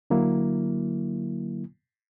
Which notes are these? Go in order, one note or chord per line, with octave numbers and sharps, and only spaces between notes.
D3 F#3 A#3 E4